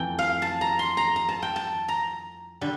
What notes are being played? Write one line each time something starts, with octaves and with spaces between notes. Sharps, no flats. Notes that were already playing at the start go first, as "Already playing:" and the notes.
Already playing: F2 E3 A3 G5
F5
A5
A#5
C6
A#5
A#5
A5
G5
A5
A#5
D3 G3